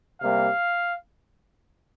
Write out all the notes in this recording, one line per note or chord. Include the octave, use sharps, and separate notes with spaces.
C3 G3 A#3 F5